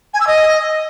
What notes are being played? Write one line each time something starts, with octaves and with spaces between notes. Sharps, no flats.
G#5
E6
D#5